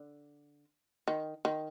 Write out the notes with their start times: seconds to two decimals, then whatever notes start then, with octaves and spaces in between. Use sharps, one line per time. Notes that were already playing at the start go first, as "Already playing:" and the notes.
Already playing: D3
1.08 D#3
1.45 D#3